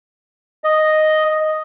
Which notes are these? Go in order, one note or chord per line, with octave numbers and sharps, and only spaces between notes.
D#5